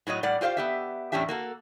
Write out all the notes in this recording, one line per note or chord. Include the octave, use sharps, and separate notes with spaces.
A2 F#3 C#5 D#5
A2 G3 D5 F#5
F4 G4 C5 E5 F5
B3 G4 E5
E2 A2 C#4 D4 G4 E5
A#3 F#4 A4